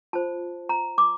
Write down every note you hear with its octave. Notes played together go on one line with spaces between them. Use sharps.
F4 C5 A5
A#5
D6